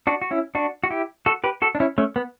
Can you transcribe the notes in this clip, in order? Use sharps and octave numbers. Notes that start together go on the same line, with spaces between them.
D4 F#4
F#4
C#4 E4
D4 F#4
F#4
E4 G4
F#4 A4
G4 B4
F#4 A4
D4
C#4 E4
A3 C#4
B3